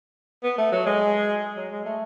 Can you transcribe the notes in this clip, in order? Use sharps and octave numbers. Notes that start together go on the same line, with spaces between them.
B3
A3
F#3
G#3
F#3
G#3
A3